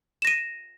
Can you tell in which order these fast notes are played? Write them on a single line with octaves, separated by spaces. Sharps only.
E7 A#6 D#7